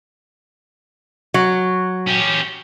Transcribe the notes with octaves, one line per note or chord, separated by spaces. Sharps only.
F#3
C#4 G4